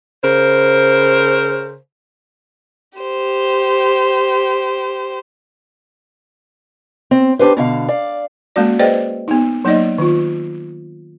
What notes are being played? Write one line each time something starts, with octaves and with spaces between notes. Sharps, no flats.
C#3 A#4 C5
G4 C5
C4
D4 G4 B4 C5
B2 D3 F5
D5 F5
G#3 A#3 C#4 F#4 D5
G#4 B4 C5 D5 D#5 G5
B3 D#4
F#3 A#3 D#4 D5 D#5
D#3 F4